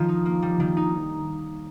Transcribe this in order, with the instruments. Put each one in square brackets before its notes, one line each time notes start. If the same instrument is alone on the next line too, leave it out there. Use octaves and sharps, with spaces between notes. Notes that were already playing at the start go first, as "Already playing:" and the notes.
Already playing: [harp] D#3 [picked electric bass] F3
[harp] D#4
A#3
G3
D#3
D#4